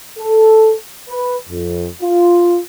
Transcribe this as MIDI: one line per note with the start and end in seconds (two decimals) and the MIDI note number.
0.19 0.75 69
1.10 1.35 71
1.50 1.87 41
2.02 2.59 65